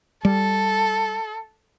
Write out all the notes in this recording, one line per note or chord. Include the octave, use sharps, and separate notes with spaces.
G3 A4